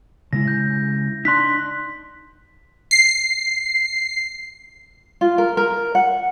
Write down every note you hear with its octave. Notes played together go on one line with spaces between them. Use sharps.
C#3 G#3 E4 A#6
G6
D4 D#4 C6 F#6 B6
C7
F4
A#4
A#4
F#5